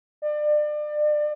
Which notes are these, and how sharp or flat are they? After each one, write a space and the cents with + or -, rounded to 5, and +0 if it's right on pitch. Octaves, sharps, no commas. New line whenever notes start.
D5 +35